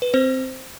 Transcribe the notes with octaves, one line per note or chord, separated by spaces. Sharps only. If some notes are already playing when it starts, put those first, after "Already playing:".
B4
C4 C5